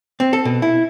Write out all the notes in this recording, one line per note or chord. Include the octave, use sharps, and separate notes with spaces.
C4
A4
B2
E4